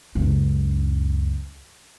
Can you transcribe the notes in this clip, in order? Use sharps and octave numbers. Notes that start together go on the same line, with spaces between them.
C#2 F#2